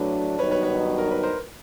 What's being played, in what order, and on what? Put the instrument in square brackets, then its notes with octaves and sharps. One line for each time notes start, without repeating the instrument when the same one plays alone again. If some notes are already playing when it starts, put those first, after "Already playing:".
Already playing: [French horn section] A2 F#3 A3 D4 [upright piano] B4
[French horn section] G2 D#3 F#3 B3 D#4 [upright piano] B4 C#5
[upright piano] B4 C#5
B4 C#5
A#4
B4
A#4 C5